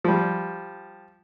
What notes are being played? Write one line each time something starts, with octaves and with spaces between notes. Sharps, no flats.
F3 G3